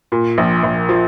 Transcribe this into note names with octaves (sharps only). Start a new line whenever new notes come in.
A#2
A#1
A#1
F3